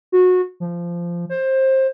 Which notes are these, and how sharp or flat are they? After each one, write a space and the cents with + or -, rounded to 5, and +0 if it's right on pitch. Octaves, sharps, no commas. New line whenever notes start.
F#4 -20
F3 -15
C5 +20